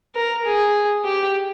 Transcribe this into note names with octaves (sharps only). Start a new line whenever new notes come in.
A#4
G#4
G4